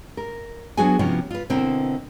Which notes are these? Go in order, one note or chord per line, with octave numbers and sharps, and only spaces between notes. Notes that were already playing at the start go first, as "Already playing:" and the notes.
A#4
F#3 B3 D4 F#4 G#4 G#5
C3 F3 B3 C#4 E4 F#4
F4 B4
B2 D3 C4 E4 A#4